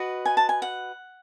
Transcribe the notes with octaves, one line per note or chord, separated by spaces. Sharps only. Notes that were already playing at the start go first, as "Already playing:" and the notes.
Already playing: F#4 B4 D#5
G#5
A5
G#5
F#5